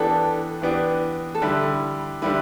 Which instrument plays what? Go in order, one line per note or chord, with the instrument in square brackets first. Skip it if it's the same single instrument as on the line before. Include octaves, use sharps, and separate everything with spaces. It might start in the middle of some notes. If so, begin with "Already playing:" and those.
Already playing: [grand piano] E3 B3 D4 G4 [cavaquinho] A4
[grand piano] E3 B3 D4 G4
[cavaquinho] A4
[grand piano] D3 G3 E4 [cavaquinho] B4
[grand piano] D3 G3 E4 [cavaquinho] B4